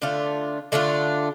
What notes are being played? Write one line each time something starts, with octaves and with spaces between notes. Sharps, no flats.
D3 A3 D4 F4
D3 A3 D4 F4